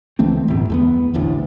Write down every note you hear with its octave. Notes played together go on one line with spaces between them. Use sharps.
C#2 E3 A3 C4
G1 E2 A2
E2 A3 B3
E1 A1 D2 A2